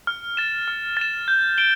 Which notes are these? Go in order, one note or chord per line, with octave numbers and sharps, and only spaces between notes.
F6
A6 E7
F6
A6 E7
G6
D7 G7